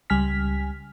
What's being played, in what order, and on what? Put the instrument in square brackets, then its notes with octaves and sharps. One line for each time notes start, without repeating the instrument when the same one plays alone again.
[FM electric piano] C#2 G3 G#5 F6 B6